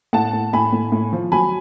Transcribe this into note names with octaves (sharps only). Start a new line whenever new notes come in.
A2 F#5 A5
A2
A2 G#5 B5
A2
A2
F3
F#3 G#5 B5